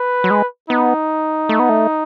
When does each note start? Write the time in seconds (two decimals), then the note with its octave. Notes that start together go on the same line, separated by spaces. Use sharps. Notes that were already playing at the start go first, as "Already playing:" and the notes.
Already playing: B4
0.24 F#3
0.30 G#3
0.70 B3 D#4
1.49 A3
1.59 B3
1.69 A3